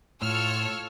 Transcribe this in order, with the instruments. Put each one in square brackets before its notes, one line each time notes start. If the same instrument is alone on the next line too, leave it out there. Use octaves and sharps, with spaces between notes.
[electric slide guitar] A2 [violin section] F4 E6 F6 [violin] A4 C#5